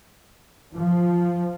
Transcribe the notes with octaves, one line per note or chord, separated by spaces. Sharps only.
F3